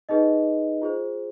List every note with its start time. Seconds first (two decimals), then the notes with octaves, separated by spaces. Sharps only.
0.09 D#4 G#4 B4 D#5
0.82 F4 G#4 C5